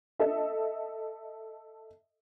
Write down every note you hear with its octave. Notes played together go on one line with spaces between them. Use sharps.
A4 D#5 E5